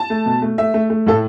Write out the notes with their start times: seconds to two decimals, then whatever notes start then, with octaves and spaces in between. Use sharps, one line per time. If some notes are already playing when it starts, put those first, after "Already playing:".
Already playing: A5
0.10 A3
0.26 B2
0.42 A3
0.58 A3 E5
0.74 A3
0.90 A3
1.06 A2 A4